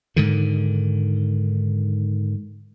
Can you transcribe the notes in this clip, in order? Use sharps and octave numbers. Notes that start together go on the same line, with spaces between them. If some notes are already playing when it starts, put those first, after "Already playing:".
G#2 D3 D#3